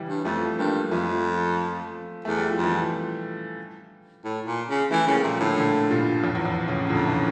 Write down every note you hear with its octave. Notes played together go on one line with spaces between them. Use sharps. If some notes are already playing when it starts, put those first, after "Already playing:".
Already playing: C#3 E3 G3
G2
F2 F3 A3
G2 G3 A#3
F2 F3 A3
E2 A3
G3
F3
F2
E3 G3
A2
A#2
C#3
E3 F3 A3
C#3 G3 A#3
A#2 F3 A3
A2 D3 F3
A#2 D3
G2 A#2
F2 A2
E2
F2
A2 C#3
F2 A#2 D3
C#3 E3